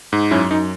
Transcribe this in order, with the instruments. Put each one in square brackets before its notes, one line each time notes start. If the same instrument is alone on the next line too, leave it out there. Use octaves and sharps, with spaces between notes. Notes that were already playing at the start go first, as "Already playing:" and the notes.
[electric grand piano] G#2
F#2 C#4 E4
F#2 D#4